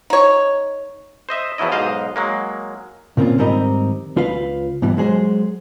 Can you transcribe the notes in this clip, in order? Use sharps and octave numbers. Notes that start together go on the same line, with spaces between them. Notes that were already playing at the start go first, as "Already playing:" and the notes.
D#4 C#5
C5 D#5 E5
E2 F3 F#3 E4 D#5
B1 G#2 C5 D#5 F5
F#3 G#3 A#3
A#2 C#3 A#3 C4 C#4 F4
G#2 D#3 G3 C4 A#4 D#5
C#2 F4 B4 F5
G#2 B2 E3 G3
F#3 G#3 G#4 C5